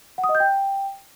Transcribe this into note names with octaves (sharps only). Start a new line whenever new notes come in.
F#5
D#6
D#5
G6
G5